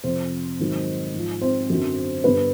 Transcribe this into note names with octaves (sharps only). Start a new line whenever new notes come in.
F2 C3 F3 C4 C5
G#2 D#3 F#3
G#2 F3
C4 C5
F#2 D3 F#3
G2 D3 G3 B3 B4